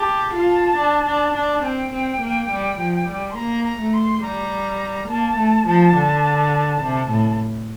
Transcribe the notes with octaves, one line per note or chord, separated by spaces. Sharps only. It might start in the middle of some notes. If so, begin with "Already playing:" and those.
Already playing: G4 A5
F4
D4
D4
D4
C4 G5
C4
A#3
G3
F3
G3
C6
A#3 A#5
A#5
A3
C6
G3 A#5
A#3 A5
A3
F3
D3
C3
A2